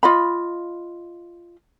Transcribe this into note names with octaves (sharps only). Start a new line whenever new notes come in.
F4 D#5 B5